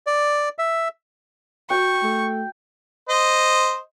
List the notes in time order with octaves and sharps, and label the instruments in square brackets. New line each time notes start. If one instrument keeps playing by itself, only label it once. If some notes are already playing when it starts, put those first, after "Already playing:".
[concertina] D5
E5
[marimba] F#4 [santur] G5 [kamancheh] C#6
[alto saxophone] A3
[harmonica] C5 D#5